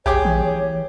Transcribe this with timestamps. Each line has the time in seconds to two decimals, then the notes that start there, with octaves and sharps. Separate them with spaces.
0.06 A#1 G4 G#4 C#5 D6
0.25 E3